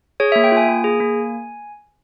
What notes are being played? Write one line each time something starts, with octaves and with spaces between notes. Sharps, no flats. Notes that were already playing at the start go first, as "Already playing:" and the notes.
G#4 C#5
A#3 E5
G5
F4 G#5
A#3
G#4
A#3